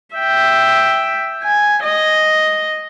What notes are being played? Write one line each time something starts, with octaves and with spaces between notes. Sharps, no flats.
E5 G5
G#5
D#5